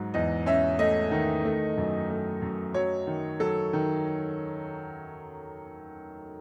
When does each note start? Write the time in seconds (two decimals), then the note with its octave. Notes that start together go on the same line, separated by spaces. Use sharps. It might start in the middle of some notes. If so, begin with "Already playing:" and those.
Already playing: G#2 F#3
0.14 E2 D#5
0.46 C#4 E5
0.79 A3 D#5
1.11 D#3
1.45 A3
1.77 F#2
2.10 A3
2.42 F#2
2.74 F#3 C#5
3.07 D#3
3.40 F#3 A4
3.73 D#3